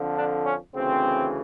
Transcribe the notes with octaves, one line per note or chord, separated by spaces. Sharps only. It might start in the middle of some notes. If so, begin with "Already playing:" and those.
Already playing: F2 D3 F3
D4
C#4
D2 C#3 E3 C4